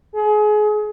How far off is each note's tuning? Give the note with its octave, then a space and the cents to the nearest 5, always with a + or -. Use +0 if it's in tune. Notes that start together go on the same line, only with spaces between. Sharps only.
G#4 +30